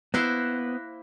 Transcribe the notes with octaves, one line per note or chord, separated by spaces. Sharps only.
A#3 B3 E4 C5 F#6 A#6